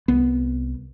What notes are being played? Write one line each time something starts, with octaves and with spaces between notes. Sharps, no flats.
C2 B3